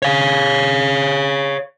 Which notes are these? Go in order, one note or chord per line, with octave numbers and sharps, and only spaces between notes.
C#5 F5